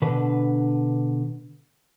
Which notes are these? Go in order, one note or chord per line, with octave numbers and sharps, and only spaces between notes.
B2 D3 D4 B4